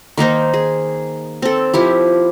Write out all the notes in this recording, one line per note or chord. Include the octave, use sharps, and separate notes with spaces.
D#3 A#3 D#4 C5
G#4
C4 A4
F3 E4 G4